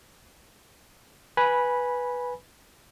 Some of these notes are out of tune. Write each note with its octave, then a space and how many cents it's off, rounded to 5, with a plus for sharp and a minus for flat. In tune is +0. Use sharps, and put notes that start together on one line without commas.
B4 -5 G#5 +0 B5 -15